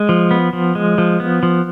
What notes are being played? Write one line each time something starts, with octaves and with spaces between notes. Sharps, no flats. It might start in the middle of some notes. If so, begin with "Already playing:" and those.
Already playing: G#3
F3
B3
F3
G#3
F3
B3
F3